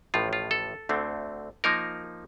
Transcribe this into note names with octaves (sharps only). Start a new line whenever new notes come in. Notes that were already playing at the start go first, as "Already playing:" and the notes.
A1 A2 F3 F4
F4
A4
D2 D3 A3 C4
F3 A#3 D#4 A#4